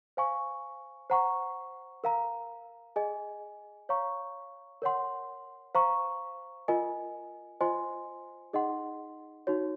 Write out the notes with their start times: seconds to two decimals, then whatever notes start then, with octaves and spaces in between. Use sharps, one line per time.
0.17 C5 F5 G#5 C#6
1.10 C5 F#5 A#5 C#6
2.04 A#4 F5 A#5
2.96 G#4 D#5 G#5
3.89 C#5 F5 A#5 C#6
4.82 A#4 C#5 F#5 C6
5.75 C5 F5 A#5 C#6
6.68 F4 A#4 D#5 G#5
7.61 F4 C5 D#5 G#5 C6
8.53 D#4 G#4 D#5 F#5 C6
9.47 D#4 F#4 C#5